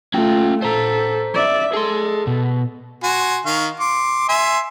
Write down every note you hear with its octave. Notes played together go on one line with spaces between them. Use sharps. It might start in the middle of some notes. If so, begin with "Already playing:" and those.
A3 C#4 F4 G5
A4 C5 A#5
D5 E5
G#4 A4 C6
B2
F#4 G#5 C6
D#3 F5 C#6
C6 D6
E5 G#5 C6